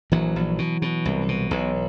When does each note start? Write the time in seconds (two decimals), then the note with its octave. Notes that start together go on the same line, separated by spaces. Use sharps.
0.12 A#1 E3 F#3
0.36 A#1
0.58 B2
0.82 B2
1.05 C2
1.29 B2
1.51 B1